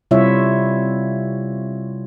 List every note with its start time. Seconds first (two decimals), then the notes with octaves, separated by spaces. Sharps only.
0.11 C3 G3 E4 F4 C#5 E5